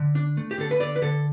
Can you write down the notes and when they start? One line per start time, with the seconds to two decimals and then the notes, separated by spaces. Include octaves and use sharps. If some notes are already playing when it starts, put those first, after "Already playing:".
Already playing: D3
0.15 D4
0.37 A3
0.51 G4
0.58 D3 A4
0.71 B4
0.80 D3 D5
0.96 B4
1.02 D3 A4